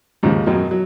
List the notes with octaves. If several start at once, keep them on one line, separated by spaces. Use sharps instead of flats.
D#2 G#2 C#3 F3
F#2 B2 D#3 F#3
F#3